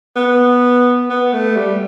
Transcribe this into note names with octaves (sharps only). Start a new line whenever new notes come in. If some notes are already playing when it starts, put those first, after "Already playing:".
B3
B3
A3
G3